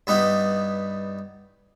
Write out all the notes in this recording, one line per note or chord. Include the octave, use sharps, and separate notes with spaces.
G2 B3 D#4 E4